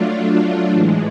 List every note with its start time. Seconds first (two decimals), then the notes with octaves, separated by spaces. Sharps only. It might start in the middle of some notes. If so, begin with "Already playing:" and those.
Already playing: F#3 A3 D4 F4
0.70 A2 E3 G#3